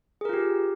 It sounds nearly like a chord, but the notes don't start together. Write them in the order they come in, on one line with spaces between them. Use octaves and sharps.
G#4 A#4 F4 G4